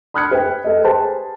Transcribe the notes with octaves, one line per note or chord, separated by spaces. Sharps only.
B5 D#6 F6 F#6 G#6 C#7
B4 G5
A4 D#5
G4 G#4 B4 C5 G#5 A5